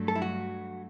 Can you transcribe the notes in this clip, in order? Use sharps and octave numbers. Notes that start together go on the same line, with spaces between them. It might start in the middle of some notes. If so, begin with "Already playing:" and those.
Already playing: G2 F#3 A3
A4
E4
F#4